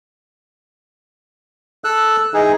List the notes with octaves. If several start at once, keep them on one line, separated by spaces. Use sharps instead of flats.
A4 E6 F#6
E3 D#4 G#4